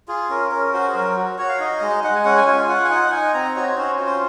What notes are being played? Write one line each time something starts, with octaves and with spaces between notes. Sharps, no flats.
F4 G#4
C#4 A#4
C#4 A#4
F#4 C5
G#4
F#3 A#4
F#4
F#4 C#5
F5
D#4 D#5
G#3
G#3 F#5
G#5
C#4 F#5
G#5
F4 G#5
F4 F#5
G#5
D#4 F#5
D#4 G#5
C4 A#5
F#4 C#5
C#4 C5
F4
C5